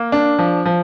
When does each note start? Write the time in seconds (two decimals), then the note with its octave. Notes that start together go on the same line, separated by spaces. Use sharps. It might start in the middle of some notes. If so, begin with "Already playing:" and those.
Already playing: A#3
0.12 D4
0.39 F3
0.66 F3